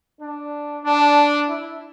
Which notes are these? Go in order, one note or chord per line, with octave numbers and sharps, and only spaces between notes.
D4
D4
E4